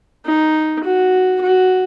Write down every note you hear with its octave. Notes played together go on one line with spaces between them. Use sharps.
D#4
F#4
F#4